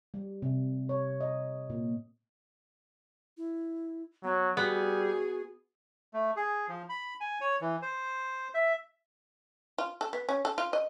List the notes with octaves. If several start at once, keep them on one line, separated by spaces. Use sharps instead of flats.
G3
C3
C#5
D#5
A#2
E4
F#3 B3
G3 B3 F#4 G#4
A3
G#4
F3
B5
G#5
C#5
E3
C5
E5
F4
A4
B3
C#4
A4
F4
D#5